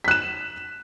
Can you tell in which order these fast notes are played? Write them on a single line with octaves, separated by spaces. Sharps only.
B6 F#6 E7